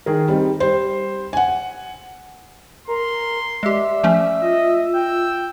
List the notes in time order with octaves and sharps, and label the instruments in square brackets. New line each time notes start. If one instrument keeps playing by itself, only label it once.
[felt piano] D#3 G#4 A#4
G3 C4 D#4
G3 C5
F#5 G#5
[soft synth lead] A#4 [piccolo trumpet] C6
[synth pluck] G#3 G4 [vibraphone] D5 D6 [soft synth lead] E5
[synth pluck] F3 A3 C#4
[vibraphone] F4 [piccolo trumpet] D#5
[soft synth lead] G5 [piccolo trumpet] E6